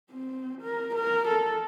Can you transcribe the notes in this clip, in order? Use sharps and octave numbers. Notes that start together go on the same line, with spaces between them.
C4
A#4
A#4
A4